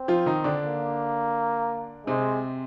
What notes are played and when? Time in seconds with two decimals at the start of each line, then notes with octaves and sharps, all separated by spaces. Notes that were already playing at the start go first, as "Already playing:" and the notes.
Already playing: C4
0.08 F3 F4
0.26 D#3 D#4
0.44 D3 D4
0.63 A#3
2.06 C3 G#3 C4